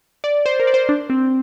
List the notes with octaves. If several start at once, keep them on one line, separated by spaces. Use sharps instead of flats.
D5
C5
A#4
D5
C5
D4
C4